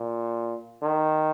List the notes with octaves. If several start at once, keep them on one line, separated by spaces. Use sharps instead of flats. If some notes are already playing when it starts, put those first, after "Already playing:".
Already playing: A#2
D#3